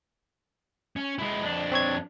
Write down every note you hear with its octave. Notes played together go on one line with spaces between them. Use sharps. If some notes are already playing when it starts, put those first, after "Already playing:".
C#4
G#3 E4
F2 D4
C4 C#5 G#6